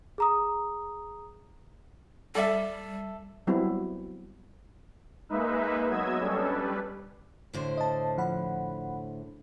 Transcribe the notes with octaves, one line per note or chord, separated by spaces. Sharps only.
G#4 A#5 D#6
G3 A4 D5 E5
F#3 G3 B3 C4 E4 F#4
G#3 A#3 D#4 B4 E5
F#3 B3 D#5 E6 G#6
G3 C#4 D4 A4
G3 B4
A2 D3 C5
D#5 A5
F3 F#5 B5